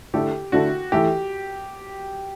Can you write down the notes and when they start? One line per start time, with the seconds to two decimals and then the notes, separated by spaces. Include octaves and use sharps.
0.14 D3 A3 E4 G4 A4
0.52 D3 A3 E4 F#4 A4
0.92 E3 A3 E4 G4 A4